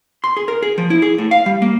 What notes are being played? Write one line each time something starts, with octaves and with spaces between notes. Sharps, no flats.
C6
G#4
A#4
G#4
F3
E4
G#4
A2
F5
G3
A#3